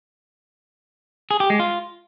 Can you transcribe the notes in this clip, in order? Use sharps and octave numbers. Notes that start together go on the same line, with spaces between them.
G#4
G4
G#3
F4